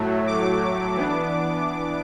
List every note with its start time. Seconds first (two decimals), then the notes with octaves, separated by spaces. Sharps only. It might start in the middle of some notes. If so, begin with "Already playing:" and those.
Already playing: A2 F#3 A3
0.27 D6
0.96 E3 B3 D4